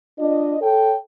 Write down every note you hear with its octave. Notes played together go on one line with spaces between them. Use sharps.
D4 F4 D#5
A4 C#5 G5